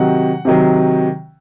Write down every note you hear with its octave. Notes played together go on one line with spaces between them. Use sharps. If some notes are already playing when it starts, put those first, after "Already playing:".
Already playing: C3 D#3 F#3 F#5
C3 D#3 F#3